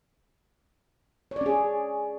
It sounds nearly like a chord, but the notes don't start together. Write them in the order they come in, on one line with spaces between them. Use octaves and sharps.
C#5 D5 C#4 G#4